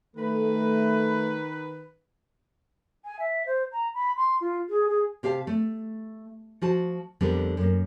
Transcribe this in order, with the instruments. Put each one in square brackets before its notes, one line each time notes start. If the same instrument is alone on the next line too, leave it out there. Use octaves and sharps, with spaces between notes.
[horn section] D#3 B4 [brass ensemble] A3
[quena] G#5
E5
C5
A#5
B5
C6
F4
G#4
G#4
[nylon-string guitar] C3 G4 F5 A5
A3
F3 F#4 A5
F2 D3 G3 B3 A#4
F#2 A#3